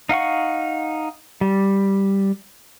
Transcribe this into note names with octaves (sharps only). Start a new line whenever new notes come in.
D#4 F5 F#5 C#6
G3